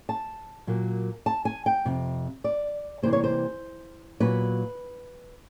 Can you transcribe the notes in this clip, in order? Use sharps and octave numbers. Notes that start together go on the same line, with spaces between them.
A5
A#2 F#3 A#3
A5
G#5
G5
F2 C3
D5
C3 E3 G3 A#3 C5
C#5
C5
A#2 F#3 B3 B4